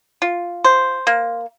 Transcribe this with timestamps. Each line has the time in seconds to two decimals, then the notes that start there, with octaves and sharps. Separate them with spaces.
0.22 F4
0.64 C5
1.07 A#3